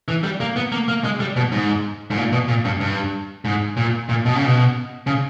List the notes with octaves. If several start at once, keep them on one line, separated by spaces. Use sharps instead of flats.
E3
G3
A#3
B3
A#3
A#3
G#3
G3
B2
G#2
G#2
A#2
B2
A#2
G2
G2
G#2
A#2
A#2
B2
C#3
B2
C#3